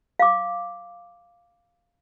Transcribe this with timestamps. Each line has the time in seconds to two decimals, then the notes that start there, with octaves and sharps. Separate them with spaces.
0.20 F5 D6